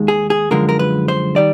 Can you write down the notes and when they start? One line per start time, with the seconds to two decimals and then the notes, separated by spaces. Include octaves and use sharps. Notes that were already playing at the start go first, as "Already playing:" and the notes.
Already playing: D#2 D#3 G#3
0.08 G#4
0.30 G#4
0.51 F#2 D3 F3 G#3 A#4
0.69 A#4
0.79 B4
1.08 C5
1.36 D#3 G3 D5